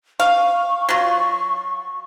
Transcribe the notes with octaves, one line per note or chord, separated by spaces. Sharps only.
F5 C#6
F#3 F4